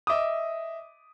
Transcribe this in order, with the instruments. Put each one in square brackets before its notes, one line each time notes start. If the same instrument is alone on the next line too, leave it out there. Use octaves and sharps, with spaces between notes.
[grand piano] D#5 E5 D6 D#6